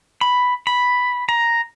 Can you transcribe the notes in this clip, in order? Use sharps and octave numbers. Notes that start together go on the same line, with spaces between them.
B5
B5
A#5